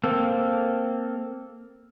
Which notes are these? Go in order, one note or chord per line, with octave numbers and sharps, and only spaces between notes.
A#3 C4 A4